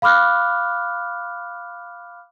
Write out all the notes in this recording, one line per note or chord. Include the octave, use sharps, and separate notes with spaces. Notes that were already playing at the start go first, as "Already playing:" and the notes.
F5 B5 D6 F6 F#6